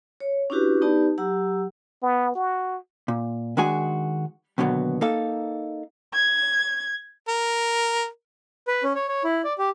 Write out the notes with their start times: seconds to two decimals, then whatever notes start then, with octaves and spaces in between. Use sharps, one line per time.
0.20 C#5
0.50 C#4 D4 E4 F#4 G4 B4
0.82 B3 D#4 G4 B4 D5 A5
1.18 F#3 G4 F#5 A#5 E6
2.03 B3
2.35 F#4
3.08 A#2
3.57 D#3 G#3 D4 F#4 G#4 G#5
4.58 D#2 B2 D3 F#3 B3
5.01 A#3 D#4 A4 F5
6.13 G#6
7.28 A#4
8.68 B4
8.84 C#4
8.95 C#5
9.08 C#5
9.24 E4
9.44 D5
9.58 G4